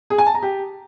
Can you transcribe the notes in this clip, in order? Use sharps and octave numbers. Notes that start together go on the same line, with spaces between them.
G#4
G#5
A5
A#5
G4